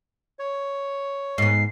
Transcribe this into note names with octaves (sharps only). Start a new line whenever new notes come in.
C#5
G#2 B3 C7